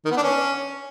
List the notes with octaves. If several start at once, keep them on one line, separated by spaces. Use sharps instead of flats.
D#3
B3
D4
C#4